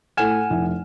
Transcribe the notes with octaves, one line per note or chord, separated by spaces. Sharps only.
A2 A4 F#5 G#5 F6 E7
F1 E4